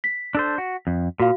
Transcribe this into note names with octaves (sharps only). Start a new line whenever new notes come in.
B6
D4 A4 C5
F#4
F2
A#2 F#4 F5